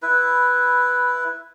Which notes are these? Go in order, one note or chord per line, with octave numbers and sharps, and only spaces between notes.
E4 B4